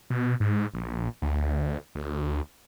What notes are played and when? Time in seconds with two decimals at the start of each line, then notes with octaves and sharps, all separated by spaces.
0.10 B2
0.40 G#2
0.74 A#1
1.22 D2
1.95 D2